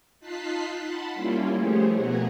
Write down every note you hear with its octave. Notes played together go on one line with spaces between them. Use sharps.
D#4 F4 A5 F#6 B6 C7
F#5 A5 B5 C6
G3 A#3 C#4 E4 F4
F3 A3 G4 G#4 C5 C#5
B2 B3 F#5 G#5 A#5